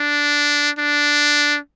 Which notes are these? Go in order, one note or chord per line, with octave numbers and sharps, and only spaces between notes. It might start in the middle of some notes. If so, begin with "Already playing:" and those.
Already playing: D4
D4